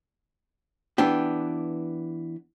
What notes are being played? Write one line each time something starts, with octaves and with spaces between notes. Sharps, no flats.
E3 B3 D4 G4